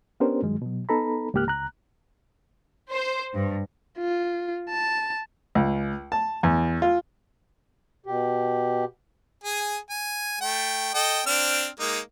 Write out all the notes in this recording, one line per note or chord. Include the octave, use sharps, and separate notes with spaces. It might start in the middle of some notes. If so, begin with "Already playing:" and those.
B3 C#4 D4 G4 A#4 C5
G2 D#3 F#3 G#3
B2 F#3
B3 D#4 A4 A#5 B5
C#2 G#2 A#3 G4 F6 F#6
C#2 A#5 F#6
C5
G2
F4
A5
C#2
A5
E2
F4
B2 G4
G#4 G#5
G#5
A3 G5
A4 D#5 G5
C4 D4 F6
G#3 A#3 D#4